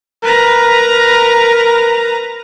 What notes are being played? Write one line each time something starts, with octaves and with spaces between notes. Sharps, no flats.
A#4 B4 A#5